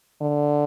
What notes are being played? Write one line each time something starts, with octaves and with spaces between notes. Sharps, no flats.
D3